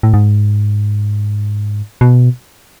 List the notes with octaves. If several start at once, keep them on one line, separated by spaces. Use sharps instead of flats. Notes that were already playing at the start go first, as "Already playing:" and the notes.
A2
G#2
B2